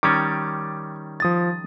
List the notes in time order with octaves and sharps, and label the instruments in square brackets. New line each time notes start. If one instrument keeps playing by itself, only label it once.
[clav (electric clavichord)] D#3 G3 C#4 [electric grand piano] D6 A6
[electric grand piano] F3 D#6 A6